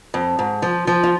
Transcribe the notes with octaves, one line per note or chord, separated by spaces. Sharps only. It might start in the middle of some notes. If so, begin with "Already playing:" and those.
F2
G#2
F3
F3
F4